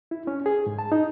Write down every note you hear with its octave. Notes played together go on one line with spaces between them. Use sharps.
E4
C#4
G#4
G#2
A5
D#4